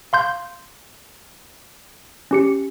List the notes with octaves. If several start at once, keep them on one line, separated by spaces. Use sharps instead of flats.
F5 C6 G6
C#4 G4 C#7